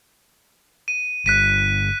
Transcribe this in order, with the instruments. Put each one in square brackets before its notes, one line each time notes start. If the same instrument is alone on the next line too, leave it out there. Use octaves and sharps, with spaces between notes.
[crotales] D#7
[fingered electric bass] G1 [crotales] F#6 B6 D#7